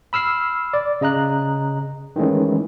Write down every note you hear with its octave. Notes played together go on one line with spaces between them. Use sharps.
B5 E6 F6 C7
D5
C#3 D#5 A#5 F#6
D#3 E3 G#3 A3 C#4